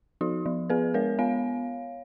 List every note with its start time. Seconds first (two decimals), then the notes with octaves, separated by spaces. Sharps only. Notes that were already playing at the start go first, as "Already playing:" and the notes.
0.21 F3 D#4 F#4
0.46 F3
0.70 B3 G#4 B4
0.94 G#3 A#4 C#5
1.19 B3 C#5 F5